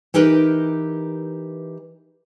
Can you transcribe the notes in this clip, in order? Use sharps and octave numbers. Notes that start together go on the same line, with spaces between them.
E3 D#4 G4 A#4 B4